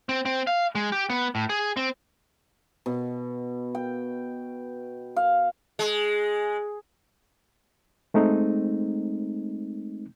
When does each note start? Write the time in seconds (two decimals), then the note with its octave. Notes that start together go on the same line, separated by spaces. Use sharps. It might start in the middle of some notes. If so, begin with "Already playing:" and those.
0.09 C4
0.25 C4
0.47 F5
0.75 G#3
0.92 G4
1.10 B3
1.35 A2
1.49 G#4
1.77 C4
2.86 B2
3.75 G5
5.16 F5
5.79 G#3
8.14 G#3 A3 C4 D#4